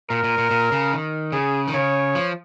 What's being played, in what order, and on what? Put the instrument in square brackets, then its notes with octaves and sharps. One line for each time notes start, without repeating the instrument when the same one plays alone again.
[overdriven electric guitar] A#2 [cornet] A#4
[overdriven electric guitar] A#2
A#2
A#2
C#3
D#3
[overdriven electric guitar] C#3 [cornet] G#4
[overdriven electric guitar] D#3
[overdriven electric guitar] C#3 [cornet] C#5
[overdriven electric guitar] F3